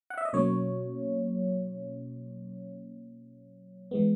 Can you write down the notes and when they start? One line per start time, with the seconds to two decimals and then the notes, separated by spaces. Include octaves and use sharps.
0.10 F#5
0.18 E5
0.25 D#5
0.33 B2 F#3 A#3 C#4 C#5
3.91 E3 G#3 B3